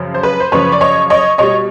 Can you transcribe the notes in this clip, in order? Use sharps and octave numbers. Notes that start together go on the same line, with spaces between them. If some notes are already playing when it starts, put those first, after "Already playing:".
Already playing: F#2 C#3 F3
C5
B4
C5
F#2 C#3 F3 B4 C#5
D5
C#5 D#5
C#5 D#5
B2 G3 C#5 D#5